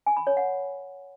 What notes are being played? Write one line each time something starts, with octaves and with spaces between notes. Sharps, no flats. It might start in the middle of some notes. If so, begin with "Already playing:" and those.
G#5
B5
C#5
F#5